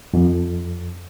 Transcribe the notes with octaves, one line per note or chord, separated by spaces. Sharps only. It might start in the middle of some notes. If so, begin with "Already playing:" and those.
F2